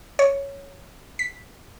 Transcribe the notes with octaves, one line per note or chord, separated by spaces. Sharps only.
C#5
B6